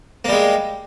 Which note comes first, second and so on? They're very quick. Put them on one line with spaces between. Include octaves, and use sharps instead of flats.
A#3 G3 G#3